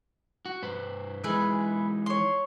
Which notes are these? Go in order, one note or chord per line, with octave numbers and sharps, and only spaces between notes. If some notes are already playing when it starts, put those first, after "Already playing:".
F#4
G2 B4 C5
E3 G#3 D#4 G#4 B4 E5
C#5 C6